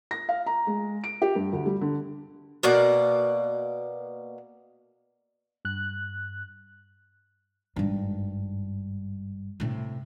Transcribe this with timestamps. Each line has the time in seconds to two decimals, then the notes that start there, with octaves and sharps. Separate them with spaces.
0.11 A#6
0.29 F5
0.46 A#5
0.67 G#3
1.04 D7
1.22 G4
1.35 G2
1.53 D2
1.66 G3
1.81 D3
2.63 B2 A#3 D5 F#5
5.65 G2 F#6
7.76 G#1 G2
9.60 A2 C3